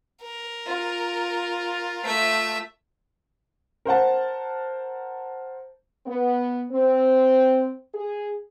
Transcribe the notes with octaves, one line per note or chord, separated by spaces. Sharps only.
A#4
F4
A3 E5
A#4 C5 F#5 A5
B3
C4
G#4